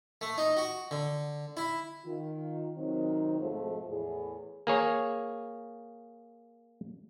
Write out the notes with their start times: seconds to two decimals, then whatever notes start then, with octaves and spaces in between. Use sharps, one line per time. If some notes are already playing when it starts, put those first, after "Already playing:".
0.21 A3
0.38 D#4
0.57 F#4
0.91 D3
1.57 E4
2.05 D#3 F4
2.76 C3 D#3 F#3 C4 D#4
3.40 F2 G#2 B2 F3 G#3 A3
3.88 E2 A2 G#4
4.67 A#3 G#4 C#5